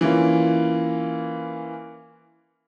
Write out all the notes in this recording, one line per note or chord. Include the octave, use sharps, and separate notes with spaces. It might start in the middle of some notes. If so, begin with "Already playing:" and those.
E3 A#3 C#4 F4